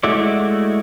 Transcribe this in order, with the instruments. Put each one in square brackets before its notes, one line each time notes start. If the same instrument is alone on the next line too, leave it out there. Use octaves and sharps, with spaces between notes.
[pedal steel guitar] G#3 A3 E4 F#4 D5